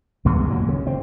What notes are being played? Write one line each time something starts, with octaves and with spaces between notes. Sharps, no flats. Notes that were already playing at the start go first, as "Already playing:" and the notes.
C#2 G2 E3 B3
D#2 A#2 F#3
C#3
C4